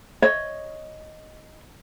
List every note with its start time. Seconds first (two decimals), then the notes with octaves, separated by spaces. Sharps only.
0.22 C#5 D#5